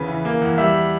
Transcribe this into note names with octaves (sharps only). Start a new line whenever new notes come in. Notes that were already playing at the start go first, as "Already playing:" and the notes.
Already playing: E2 C#3 B4
E3
A#3
E2
G3 E5